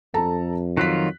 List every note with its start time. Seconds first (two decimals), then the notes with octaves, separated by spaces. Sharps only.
0.14 F2 A4 A5 A#5
0.77 D#3 F#3 F4 F#6 B6